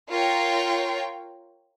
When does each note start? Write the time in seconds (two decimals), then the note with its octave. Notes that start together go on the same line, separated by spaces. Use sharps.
0.10 F4 A#4 C#5 G5